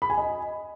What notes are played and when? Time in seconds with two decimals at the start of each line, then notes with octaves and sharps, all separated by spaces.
0.02 B5
0.10 G#5
0.18 D#5